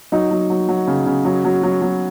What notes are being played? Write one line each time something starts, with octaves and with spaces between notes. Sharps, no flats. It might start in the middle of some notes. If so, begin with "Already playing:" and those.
F#3 D#4
F#3
F#3
F#3
C#3
C#3
F#3
F#3
F#3
F#3